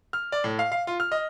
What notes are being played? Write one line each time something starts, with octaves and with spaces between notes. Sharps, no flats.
F6
D5
A2
F5
F5
F4
F6
D#5